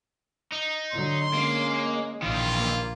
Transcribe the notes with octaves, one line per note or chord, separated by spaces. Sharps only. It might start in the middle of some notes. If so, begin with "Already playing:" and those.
D#4
D3 F#3 C6
G#3 A#3 C#4
A#1 D#3 E3 F4
A#3